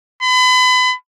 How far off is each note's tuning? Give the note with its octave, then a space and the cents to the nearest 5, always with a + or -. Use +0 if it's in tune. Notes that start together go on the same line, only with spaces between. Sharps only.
B5 +35